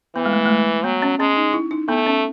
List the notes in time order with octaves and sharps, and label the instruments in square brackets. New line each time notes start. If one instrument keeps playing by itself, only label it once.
[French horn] E3 [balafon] B3
[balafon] G#3
A3
A3
G#3
[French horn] F#3 [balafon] B3
[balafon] C#4
[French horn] G#3 [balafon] C#4
[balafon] D#4
E4
D#4
[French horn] A3 [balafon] B3
[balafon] C#4